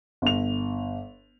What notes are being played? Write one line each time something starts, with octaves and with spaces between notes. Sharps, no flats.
G1 F7